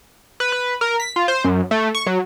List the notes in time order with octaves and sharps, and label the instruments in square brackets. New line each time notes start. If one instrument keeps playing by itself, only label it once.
[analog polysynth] B4
B4
A#4
B6
F4
C5
F#2
A3
C#6
F#3